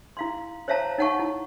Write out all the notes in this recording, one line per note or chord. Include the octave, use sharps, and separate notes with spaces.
E4 F5 C6
C5 C#5 E5 F5 A5 A#5
D#4 C#5 F#5 A5 C#6
E4